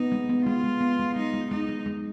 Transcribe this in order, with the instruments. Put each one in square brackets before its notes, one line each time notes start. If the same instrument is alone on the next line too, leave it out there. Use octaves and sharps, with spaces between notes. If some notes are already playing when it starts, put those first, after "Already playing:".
Already playing: [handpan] B3 [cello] D#4
[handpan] G#3
B3
[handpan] G#3 [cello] F4
[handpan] G#3
B3
G#3
[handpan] G#3 [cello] D#4
[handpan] G#3
[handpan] G#3 [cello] D#4
[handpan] G#3
G#3